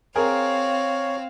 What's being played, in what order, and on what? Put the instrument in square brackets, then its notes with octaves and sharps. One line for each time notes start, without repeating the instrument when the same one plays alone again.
[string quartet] C4 F5 [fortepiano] G#4 A#4 [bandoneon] C#5